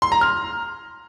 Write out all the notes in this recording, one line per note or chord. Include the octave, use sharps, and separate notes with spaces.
C6
A#5
F6